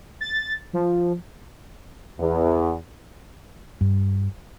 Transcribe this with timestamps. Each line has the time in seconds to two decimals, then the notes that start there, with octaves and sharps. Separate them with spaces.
0.21 A6
0.73 F3
2.20 E2
3.81 G2